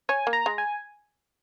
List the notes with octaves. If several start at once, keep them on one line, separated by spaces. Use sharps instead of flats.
C#5 G#5
A#3
A#5
G#3
G#5